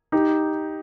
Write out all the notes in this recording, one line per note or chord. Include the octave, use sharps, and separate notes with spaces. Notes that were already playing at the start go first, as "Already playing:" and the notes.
D#4 G4